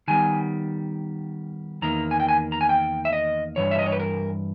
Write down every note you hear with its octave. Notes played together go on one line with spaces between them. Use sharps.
D#3 G3 B3 G#5
E2 D#3 A#3 A#5
G#5
G5
G#5
A#5
G#5
G5
E5
D#5
G2 E3 C#5
E5
D#5
C#5
B4
A#4